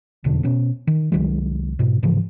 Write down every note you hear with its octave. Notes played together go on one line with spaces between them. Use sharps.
F1 E2 B2 D3
B2 C#4
D#3
C2 D#3 F#3 G#3
G#2 B2
G#2 C#3 E3 F3